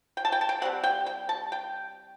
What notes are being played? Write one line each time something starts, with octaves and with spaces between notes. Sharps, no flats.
G5
A5
G5
A5
G5
C3 G3 C4 F#5
G5
G5
A5
G5